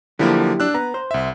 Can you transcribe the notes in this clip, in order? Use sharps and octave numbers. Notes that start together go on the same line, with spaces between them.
D3 F3 F#3 A#3 E4 G4
D4 E6 F#6
B3 A#5
C5
C2 E5